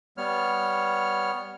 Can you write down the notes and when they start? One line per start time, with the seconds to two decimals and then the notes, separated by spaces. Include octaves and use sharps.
0.17 G3 B3 C#5 F6